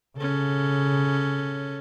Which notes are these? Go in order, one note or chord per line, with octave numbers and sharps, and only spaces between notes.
C#3 C#4 A4